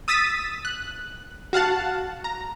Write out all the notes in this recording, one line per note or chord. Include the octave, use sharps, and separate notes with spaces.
D#6 E6 A6 B6 D#7
F#6
F#4 F5 F#5 A5
A#5